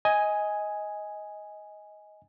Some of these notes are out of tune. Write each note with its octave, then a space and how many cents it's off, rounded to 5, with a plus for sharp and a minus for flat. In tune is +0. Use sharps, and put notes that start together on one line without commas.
D#5 +15 G#5 +0